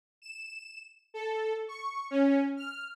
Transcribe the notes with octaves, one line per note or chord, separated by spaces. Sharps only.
E7
A4
C#6
C#4
F6